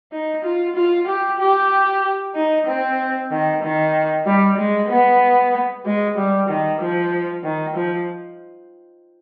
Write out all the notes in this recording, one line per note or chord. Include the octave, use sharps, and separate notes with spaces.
D#4
F4
F4
G4
G4
D#4
C4
D#3
D#3
G3
G#3
B3
G#3
G3
D#3
F3
D#3
F3